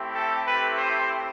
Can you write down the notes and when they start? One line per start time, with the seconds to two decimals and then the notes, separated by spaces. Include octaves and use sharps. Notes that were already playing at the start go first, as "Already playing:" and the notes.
Already playing: A3 C4 E4 G4
0.14 A4
0.46 B4
0.77 C5